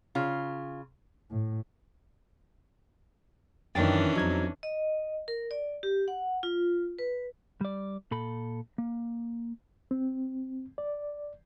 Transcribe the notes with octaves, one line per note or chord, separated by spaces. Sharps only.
C#3 F4
A2
F#2 D#3 E3 C#4 D4 G5 A6
F2 F#3 D#4 G#6
D#5
A#4
D5
G4
F#5
F4
B4
G3 D5
A#2 A4 B5
A#3
C4
D5